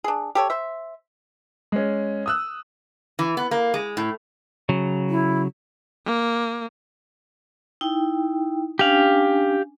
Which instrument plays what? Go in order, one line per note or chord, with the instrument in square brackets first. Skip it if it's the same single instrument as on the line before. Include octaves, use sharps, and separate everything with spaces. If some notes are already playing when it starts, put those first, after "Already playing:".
[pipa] D4 G#4
G4 A4 C#5
C5 E5
[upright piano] G#3 C#4
D#6 E6 F#6
[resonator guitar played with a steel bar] E3
B3
A#3
G#3
A2
[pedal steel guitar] C#3 F#3
[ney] E4
[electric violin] A#3
[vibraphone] D#4 E4 G5
[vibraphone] C#4 D4 G#5 [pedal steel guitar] G4 F5